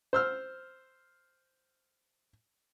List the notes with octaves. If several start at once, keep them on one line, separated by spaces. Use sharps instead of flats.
C5 E6 F6